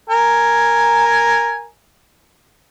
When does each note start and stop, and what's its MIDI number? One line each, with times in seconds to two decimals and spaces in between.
0.10 1.65 70
0.10 1.65 80